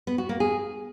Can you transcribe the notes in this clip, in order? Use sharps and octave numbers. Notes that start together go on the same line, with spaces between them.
B3
F#4
A#3
G#4